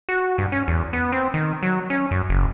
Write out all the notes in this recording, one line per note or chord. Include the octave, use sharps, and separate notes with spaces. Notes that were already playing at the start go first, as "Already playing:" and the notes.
F#4
G2
C#4
E2
B3
C4
D#3
F#3
C#4
F#2
F#1